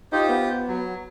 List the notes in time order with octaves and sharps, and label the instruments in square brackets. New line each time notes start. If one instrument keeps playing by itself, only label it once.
[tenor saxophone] D#4 [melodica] F4 G4 C5
[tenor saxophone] B3
[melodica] F#3